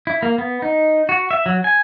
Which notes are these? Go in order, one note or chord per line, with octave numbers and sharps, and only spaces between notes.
E4
A#3
B3
D#4
F#4
E5
F#3
G#5